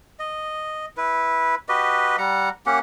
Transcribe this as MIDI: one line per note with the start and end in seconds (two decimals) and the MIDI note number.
0.19 0.86 75
0.97 1.55 64
0.97 1.55 71
1.69 2.16 66
1.69 2.16 67
1.69 2.16 71
1.69 2.16 75
2.18 2.49 55
2.18 2.49 78
2.18 2.49 82
2.66 2.79 58
2.66 2.79 61
2.66 2.79 67
2.66 2.79 78